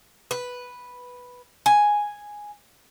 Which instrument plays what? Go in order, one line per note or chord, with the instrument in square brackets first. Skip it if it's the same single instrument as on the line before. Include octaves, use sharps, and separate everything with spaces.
[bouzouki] B4
G#5